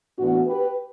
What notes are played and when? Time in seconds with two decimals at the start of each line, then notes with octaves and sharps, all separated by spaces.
0.18 A2 E3 B3 D4 F#4
0.47 G4 B4